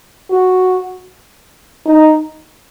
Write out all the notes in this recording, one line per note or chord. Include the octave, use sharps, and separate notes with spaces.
F#4
D#4